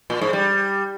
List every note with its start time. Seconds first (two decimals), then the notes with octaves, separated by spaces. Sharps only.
0.10 A#2
0.22 G#2
0.33 G3